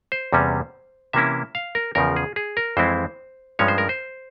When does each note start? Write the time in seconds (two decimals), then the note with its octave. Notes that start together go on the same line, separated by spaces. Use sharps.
0.12 C5
0.33 E2 C3 G3 C#4
1.13 C3 E3 A#3 C#4 E4 E5
1.55 F5
1.75 A#4
1.95 E2 C#3 F3 A#4
2.16 G#4
2.36 G#4
2.57 A#4
2.77 F2 E3 G#3 C4 E4 C5
3.59 G2 F3 G#3 C#4 C#5
3.68 C5
3.78 A#4
3.89 C5